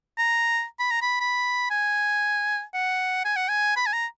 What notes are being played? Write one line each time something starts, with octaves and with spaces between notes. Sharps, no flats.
A#5
B5
A#5
B5
B5
G#5
F#5
G#5
F#5
G#5
B5
G#5
A#5